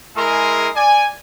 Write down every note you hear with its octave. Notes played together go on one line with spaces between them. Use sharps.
G#3 E4 G#4 A#4 C6
D5 G#5